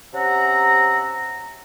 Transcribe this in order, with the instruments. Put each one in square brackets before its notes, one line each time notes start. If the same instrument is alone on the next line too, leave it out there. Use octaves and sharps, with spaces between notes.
[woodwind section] C3 C#4 E5 F#5 A#5